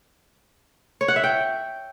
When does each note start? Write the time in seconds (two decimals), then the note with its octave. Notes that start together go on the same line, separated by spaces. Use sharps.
1.01 C#5
1.08 F#5
1.16 E5
1.24 G5